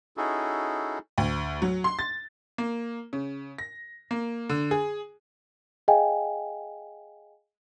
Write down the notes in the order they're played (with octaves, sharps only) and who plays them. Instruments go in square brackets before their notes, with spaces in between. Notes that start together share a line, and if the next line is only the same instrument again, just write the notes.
[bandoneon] C#4 D#4 E4 F#4 G#4 A4
[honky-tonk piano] D2
F#3
C6
A6
A#3
C#3
A#6
A#3
D3
G#4
[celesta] G#4 D#5 F5 G5 G#5